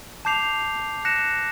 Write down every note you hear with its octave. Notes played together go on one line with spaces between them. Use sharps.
A5 D6 G6 C7 F7
F#6 A#6 C#7 E7